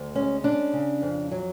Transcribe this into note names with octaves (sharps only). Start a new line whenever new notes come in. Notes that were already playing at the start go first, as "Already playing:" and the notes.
Already playing: D2
G#3 C#4
C#4 D4
C#3
F2
F#3